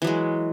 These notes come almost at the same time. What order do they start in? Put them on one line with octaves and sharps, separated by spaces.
E3 F#3 G#3